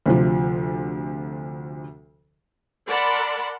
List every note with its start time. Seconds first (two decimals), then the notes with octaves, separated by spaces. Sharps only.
0.06 D2 C3 F3
2.86 A#4 D5 F#5 A5 B5 C6